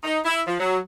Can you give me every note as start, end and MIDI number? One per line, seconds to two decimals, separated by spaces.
0.04 0.18 63
0.25 0.40 64
0.46 0.56 53
0.60 0.78 54